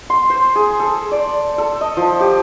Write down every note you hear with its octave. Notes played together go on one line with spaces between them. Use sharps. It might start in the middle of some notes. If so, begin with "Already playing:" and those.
C6
C5
G#4
A4
D5
A4
D#5
F3
G4